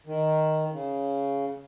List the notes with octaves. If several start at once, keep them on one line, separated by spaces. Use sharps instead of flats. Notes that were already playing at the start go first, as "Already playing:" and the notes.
D#3
C#3